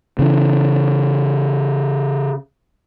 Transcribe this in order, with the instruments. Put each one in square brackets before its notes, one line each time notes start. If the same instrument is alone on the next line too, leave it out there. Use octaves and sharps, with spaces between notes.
[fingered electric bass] C#3 E3